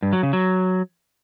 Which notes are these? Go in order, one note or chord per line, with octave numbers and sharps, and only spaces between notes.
G2
F#3
C#3
F#3